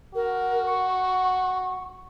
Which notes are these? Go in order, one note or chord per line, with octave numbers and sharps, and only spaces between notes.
F#4 A#4
C#6